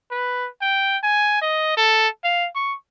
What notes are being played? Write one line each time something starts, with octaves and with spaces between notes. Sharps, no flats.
B4
G5
G#5
D#5
A4
F5
C#6